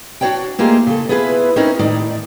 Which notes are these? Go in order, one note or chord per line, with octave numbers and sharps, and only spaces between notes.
D4 F#4 G#4 C#5 D5 G5
A3 A#3 D#4 F4 G4 G#4
C#3 A4
B3 E4 F4 G#4 A#4 B4
C4 C#4 D#4 E4 A#4 C#5
A2 D#3 D#4 D5